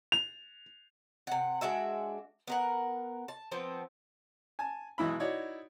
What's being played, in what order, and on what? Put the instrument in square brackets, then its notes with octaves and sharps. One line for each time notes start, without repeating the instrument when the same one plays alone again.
[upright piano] F7
[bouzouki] C3 F#5
G#3 D4 F#4 E5
B3 A#4 F#5
A5
F3 B3 C4
[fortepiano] G#5 A5
B1 E3 G#3 E4 E5 B5
D#4 E4 F#4 C#5 D5